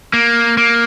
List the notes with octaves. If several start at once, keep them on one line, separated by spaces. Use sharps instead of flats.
A#3
A#3